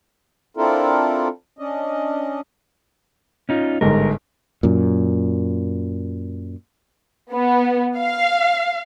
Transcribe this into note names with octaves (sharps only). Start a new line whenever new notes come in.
C4 D4 E4 F4 A4 A#4
C#4 D4 D#5
C#4 D#4 F4
G1 G#2 A#4
F#2 A#2
B3
F5